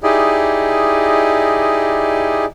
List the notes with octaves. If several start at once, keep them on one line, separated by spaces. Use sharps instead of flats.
D#4 E4 G4 G#4 D5 D#5